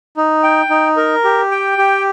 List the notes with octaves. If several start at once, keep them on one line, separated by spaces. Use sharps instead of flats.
D#4
G5
D#4
A#4
G4
G5
G4